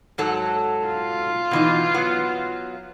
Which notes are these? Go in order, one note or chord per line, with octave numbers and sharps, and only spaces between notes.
G#2 F#3 A4
F4
B2 E3 D#4
F#3 B3